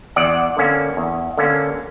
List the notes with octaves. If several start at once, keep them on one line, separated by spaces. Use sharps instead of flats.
E2 D5 F#5
D3 A#3 C#4
E2
D3 A#3 C#4